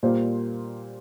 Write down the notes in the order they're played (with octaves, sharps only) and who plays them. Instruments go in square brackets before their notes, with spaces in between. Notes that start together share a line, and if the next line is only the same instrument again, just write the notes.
[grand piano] A#2 G3 A#3 F4 C5